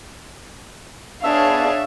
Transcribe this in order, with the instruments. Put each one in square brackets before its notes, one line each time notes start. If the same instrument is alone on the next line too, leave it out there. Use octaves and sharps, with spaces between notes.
[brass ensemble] B3 A5 [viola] D4 G#4 [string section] C#5 F5 [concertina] E5